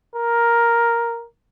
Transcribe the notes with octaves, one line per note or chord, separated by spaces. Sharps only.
A#4